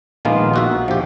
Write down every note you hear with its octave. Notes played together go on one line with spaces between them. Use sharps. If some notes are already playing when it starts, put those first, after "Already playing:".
A#1 D#3 G#3 A#3 B3 F4
D#4 F#4 E5
A#1 D#2 F3 G4